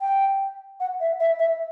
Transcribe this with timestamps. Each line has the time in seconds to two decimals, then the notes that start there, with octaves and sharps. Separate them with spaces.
0.01 G5
0.80 F#5
1.00 E5
1.20 E5
1.40 E5